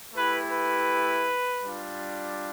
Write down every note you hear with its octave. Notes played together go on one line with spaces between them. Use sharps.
A3 E4 G4 B4
B4
G3 D4 F4